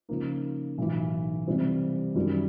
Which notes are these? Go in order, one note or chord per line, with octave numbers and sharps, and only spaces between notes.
C#3 F3 A#3 D#4
B1 A2 E3
C3 E3 G3 C4
F#2 D#3 G3